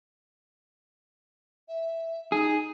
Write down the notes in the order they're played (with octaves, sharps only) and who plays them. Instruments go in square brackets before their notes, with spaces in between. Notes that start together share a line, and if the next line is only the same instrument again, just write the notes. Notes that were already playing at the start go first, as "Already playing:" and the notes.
[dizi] E5
[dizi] D#4 [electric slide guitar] G#4